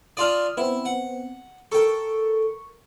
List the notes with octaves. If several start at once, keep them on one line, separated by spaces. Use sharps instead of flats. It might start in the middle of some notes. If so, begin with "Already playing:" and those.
D4 F4 D5 D#6 F6
B3 C4 E4
F#5
A4 A#4 G5 C#6